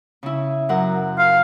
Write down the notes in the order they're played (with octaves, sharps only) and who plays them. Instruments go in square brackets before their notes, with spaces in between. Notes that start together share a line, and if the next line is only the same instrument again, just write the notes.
[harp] C#3 E4
F#2 A#4 F#5
[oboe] F5